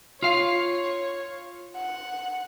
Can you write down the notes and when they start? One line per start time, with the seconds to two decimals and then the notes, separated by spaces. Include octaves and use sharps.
0.22 F4 C#5 F5
1.76 F#5